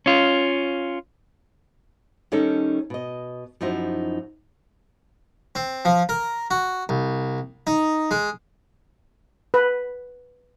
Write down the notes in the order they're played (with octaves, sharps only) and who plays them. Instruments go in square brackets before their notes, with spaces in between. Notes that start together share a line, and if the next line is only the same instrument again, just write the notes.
[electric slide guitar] C#4 F4
[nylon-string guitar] D#3 G3 C#4 D#4 A4
B2 D#5
F#2 F3 D#4 E4 F#4 C5
[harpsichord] C4
F3
A#4
F#4
C2
D#4
G#3
[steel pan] B4